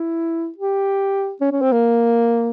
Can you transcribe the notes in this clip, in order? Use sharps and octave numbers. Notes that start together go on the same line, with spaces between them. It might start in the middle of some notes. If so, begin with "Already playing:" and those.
Already playing: E4
G4
C#4
C#4
C4
A#3